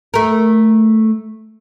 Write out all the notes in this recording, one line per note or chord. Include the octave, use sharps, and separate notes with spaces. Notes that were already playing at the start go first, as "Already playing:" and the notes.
A3 A#4